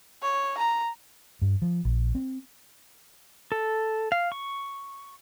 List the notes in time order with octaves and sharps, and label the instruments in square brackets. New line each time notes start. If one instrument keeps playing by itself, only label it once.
[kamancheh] C#5
A#5
[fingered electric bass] G2
F3
A#1
C4
[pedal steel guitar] A4
F5
C#6